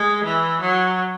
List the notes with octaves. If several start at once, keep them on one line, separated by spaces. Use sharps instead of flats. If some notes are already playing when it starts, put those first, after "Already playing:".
Already playing: G#3
E3
F#3